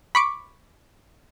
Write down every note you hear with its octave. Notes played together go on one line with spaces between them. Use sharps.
B5 C#6 D6